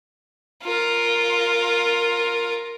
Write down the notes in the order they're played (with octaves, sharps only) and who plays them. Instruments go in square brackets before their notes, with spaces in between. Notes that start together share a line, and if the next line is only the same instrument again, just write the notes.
[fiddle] F4 A#4